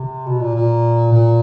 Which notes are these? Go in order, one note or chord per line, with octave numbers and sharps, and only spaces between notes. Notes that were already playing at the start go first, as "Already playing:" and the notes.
Already playing: C3
B2
A#2
A#2
A#2